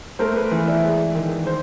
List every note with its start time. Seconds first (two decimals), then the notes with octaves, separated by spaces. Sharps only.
0.19 A3 A#4 C5
0.36 B4
0.51 E3
0.67 D5 E5
0.83 G#3
1.15 D#3
1.47 C5